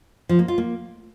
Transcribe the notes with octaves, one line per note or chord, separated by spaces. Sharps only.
F3
A#3
F4
A#3